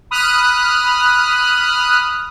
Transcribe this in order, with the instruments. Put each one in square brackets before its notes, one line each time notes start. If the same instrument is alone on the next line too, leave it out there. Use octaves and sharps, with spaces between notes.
[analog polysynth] B5 D#6 F6 F#6